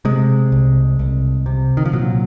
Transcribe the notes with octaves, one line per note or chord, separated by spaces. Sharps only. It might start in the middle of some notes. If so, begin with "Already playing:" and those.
C3 G#3
C2
C2
C3
D#3
F3
A#2 F#3